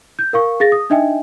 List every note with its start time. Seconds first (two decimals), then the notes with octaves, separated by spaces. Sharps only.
0.19 G6
0.33 A#4 F5 C#6
0.60 G#4 F5 A6 A#6
0.72 D#6
0.90 D4 D#4 D#5 E5 G5 G#5